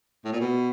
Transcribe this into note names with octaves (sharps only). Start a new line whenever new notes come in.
A2
A#2
B2